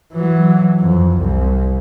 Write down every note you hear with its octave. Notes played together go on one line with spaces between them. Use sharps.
E3 F#3
F2
C2